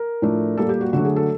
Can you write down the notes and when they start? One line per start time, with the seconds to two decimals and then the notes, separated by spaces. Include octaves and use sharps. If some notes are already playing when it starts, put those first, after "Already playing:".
Already playing: A#4
0.22 A2 F3 A3 D4
0.57 A#2 G3 A#3 A4
0.69 G4
0.81 F#4
0.93 D3 F#3 A3 D4 F#4
1.05 G#4
1.16 A4